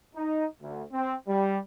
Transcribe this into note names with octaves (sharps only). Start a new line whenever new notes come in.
D#4
D2
C4
G3